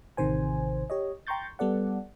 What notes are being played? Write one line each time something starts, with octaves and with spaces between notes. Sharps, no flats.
A1 C3 D#3 C5 G#5
G4 C#5 D#5
G5 A#5 C6 C#6 G6 A6
G3 B3 A4 D5 F#5